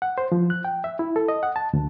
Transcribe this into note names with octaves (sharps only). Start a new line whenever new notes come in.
F#5
C5
F3
F#6
G5
E5
E4
A4
D#5
F#5
A5
D2